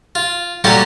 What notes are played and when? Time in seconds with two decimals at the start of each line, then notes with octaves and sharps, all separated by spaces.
0.15 F4
0.64 A#2 F#3 G3 A3 C#4 G4